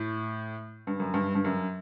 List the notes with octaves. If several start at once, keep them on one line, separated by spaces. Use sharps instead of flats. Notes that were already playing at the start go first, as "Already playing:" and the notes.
Already playing: A2
G2
F#2
G2
G2
F#2